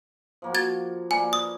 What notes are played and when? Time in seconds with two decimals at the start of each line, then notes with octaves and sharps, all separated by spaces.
0.42 F3 A#3 F#4
0.55 G#6 A6
1.11 A#3 B4 D5 G#5
1.33 D#6